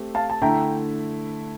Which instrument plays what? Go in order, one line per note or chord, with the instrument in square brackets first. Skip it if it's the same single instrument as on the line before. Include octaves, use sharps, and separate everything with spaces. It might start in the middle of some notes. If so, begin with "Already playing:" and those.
Already playing: [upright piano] A3 C4 G4
[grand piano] F5 A5
A5
[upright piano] D3 A3 E4 [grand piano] G5 A#5